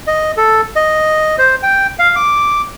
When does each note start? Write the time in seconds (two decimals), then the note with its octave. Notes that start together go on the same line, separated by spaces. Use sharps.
0.07 D#5
0.37 A4
0.76 D#5
1.38 C5
1.63 G5
1.99 F5
2.16 D6